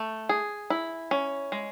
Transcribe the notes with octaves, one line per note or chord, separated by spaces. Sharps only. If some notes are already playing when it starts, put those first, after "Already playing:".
Already playing: A3
G#4
E4
C#4
G#3